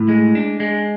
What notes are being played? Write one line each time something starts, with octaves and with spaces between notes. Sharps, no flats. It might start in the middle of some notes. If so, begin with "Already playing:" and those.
Already playing: A2
G#3
D4
G#3